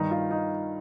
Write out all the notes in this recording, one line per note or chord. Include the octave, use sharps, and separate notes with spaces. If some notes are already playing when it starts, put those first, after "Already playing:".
Already playing: G2 D#3 D#4
F4
D#4